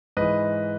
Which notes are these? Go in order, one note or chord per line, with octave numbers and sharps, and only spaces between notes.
G#2 E3 B4 D#5